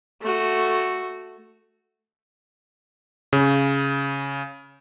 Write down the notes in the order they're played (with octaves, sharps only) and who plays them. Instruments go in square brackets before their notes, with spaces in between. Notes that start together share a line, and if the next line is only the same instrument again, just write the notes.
[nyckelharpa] A3 F#4
[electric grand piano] C#3